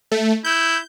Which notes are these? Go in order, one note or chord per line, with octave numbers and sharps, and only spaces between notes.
A3
E4 G6